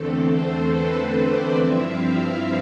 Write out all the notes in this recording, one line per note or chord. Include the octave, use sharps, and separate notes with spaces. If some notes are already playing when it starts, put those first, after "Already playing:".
Already playing: E2 D3 A3 C4 A4
C5
B4
B4
D5
G2 F3 C4 E4 E5
F5
F5